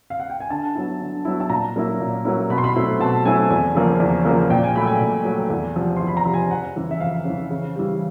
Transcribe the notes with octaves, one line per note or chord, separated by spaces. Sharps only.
F5
F#5
G5
G#5
D3 A5
F#3 B3 E4
D3
F#3 B3 E4
A5
A#2 A#5
F#3 A#3 C#4 E4
A#2
F#3 A#3 C#4 E4
B2 B5
C6
B5
F#3 A3 C4 E4
B2 A5
F#3 A3 C4 E4 G#5
E2 G#5
C#3 F3 A#3
E2
C#3 F3 A#3
A#2 G5
G#5
F#3 A3 B5
G#5
A#2
F#3 A3
E2
C3 F3
E2 C6
B5
A#5
C3 F3
G#5
F2 F#5
C#3 E3
E5
F2 F5
C#3 E3
C#3
E3 G3